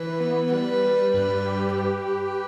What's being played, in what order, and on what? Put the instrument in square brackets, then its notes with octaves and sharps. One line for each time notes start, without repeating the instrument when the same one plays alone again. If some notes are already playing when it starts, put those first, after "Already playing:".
Already playing: [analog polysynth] E3 [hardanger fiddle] B4
[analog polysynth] B3
[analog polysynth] G3 [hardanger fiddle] B4
[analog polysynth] G3
[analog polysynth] G2 [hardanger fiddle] B4
[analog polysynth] G4
[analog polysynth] G4 [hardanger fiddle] B4
[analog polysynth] G4